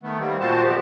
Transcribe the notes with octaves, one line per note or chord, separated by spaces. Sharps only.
D#3 A3 B3
D#3 G3 A#3 C4
A#2 C4 F#4 C5 A5
F2 C3 B3 C4 G4